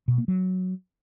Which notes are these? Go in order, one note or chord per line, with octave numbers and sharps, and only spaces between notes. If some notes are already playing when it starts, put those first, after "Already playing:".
B2
A#3
F#3